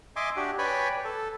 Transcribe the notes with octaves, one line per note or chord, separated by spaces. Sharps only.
D#5 E5 G#5 C6 D6
D4 F#4 G4
B4 C#5 D5 G5 G#5 B5
A4